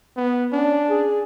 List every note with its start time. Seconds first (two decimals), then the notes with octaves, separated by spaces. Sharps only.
0.17 B3
0.53 C#4 D4
0.89 G#4